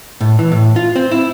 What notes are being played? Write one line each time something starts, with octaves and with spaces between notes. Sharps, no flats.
A2
E3
A2
F4
C4
E4